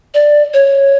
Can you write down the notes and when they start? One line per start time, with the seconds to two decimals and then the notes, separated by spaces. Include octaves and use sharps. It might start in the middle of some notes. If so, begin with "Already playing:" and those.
0.14 D5
0.54 C#5